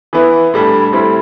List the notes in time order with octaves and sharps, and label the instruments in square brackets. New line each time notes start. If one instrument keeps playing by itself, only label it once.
[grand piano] E3 B3 E4
A2 G3 D4
A2 G3 C4 E4